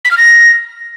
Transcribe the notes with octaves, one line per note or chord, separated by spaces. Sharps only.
B6
F6
A#6